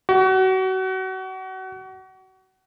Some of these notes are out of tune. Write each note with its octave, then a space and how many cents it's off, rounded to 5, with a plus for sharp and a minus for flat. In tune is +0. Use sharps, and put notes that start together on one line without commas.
F#4 +30